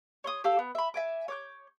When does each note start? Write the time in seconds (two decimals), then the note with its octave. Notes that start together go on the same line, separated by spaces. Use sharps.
0.24 C#5 C6 D#6
0.44 G4 A4 F5 E6
0.59 B3
0.75 E5 B5
0.94 E5 G#5 D6
1.28 C#5 D6 G6